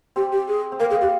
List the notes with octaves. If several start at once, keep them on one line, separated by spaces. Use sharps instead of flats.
C4 G4
G4
G#4
C4
A#3 A#4
G#4
G4